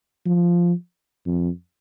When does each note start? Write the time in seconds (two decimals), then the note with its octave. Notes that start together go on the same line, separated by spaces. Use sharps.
0.26 F3
1.26 F2